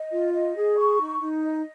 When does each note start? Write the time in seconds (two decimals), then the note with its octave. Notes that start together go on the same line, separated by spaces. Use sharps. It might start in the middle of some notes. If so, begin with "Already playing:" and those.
Already playing: D#5
0.12 F4
0.33 D#5
0.55 G#4
0.77 C#6
1.00 D#4
1.21 D#4
1.44 D#5